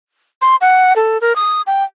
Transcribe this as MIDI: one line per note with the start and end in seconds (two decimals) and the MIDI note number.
0.41 0.56 84
0.61 0.93 78
0.96 1.20 69
1.21 1.35 70
1.36 1.62 87
1.67 1.84 79